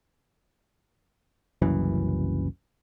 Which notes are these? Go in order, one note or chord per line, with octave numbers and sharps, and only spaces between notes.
F#1 C2 F#2 E3